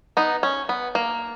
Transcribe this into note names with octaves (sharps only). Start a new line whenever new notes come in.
B3 D#4
C#4
B3
A#3